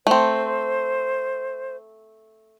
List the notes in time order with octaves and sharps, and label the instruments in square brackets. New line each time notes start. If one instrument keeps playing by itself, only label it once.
[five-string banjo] A3 C4 [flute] C5